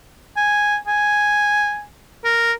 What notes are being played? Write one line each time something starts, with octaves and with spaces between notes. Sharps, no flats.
G#5
G#5
A#4